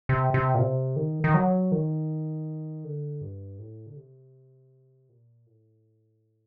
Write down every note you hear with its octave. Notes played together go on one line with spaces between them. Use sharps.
C3
C3
A#2
C3
D#3
D#3
F#3
D#3
D3
G2
A2
D3
C3
A#2
A2